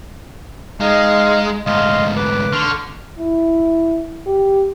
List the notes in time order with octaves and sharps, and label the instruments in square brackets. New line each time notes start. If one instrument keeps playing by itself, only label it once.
[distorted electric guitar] G#3 [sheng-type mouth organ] D#4 F5
[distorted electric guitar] D2 G#2 [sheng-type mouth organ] D#5 F5 C6
[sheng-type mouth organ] B4 D6
[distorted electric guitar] D3 [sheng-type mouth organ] C6 C#6 F6
[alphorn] E4
G4